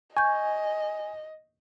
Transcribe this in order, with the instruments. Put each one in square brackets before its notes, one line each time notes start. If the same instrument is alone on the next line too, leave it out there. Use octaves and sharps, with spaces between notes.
[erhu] D#5 [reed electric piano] G#5 [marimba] C#6 G6